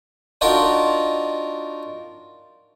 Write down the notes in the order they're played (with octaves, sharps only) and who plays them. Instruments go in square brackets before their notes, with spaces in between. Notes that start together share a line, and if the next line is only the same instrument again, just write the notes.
[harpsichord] D4 D#4 F4 F#4 A#4 D5